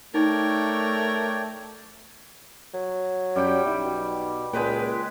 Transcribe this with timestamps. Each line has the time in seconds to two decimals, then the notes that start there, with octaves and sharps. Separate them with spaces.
0.14 A3 D#4 A#4 C#5 D5 G5
2.74 F#3
3.36 F#2 G3 G5
3.65 B1 E4
3.84 B2
4.53 C#2 A#2 G#3 B4 G5